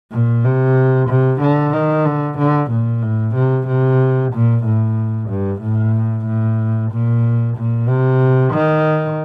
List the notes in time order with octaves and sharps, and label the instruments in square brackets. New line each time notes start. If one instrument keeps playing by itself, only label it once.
[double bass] A#2
C3
C3
D3
D#3
D3
D3
A#2
A2
C3
C3
A#2
A2
G2
A2
A2
A#2
A#2
C3
D#3